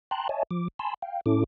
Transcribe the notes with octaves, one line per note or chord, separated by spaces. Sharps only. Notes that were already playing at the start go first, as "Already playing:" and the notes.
G5 A5 A#5 C6 F#6
C#5 D#5 E5 G#5 A5
F3 D6
G#5 A5 B5 C6 E6
F5 G5
A2 C#4 E4 A4 D6